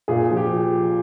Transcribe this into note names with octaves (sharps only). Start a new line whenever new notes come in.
A#2 G#4
F3
G4